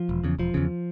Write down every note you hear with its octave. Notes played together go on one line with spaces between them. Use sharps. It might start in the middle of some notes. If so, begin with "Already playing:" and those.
Already playing: F3
E1
E2 C#3
E1 F3
E2 C#3